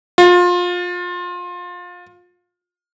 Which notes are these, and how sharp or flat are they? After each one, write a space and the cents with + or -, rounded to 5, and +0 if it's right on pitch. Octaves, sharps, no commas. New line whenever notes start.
F4 +25